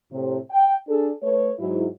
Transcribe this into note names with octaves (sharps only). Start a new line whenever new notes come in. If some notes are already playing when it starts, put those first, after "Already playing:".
A2 C3
G5
D4 G#4 A4
A3 B4 C#5
G#2 F#3 E4